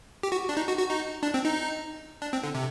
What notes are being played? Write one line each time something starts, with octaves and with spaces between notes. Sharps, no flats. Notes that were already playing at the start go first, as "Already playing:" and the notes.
G4
F#4
D4
D#4
F#4
F#4
D#4
D4
C4
D#4
D4
C4
D3
C3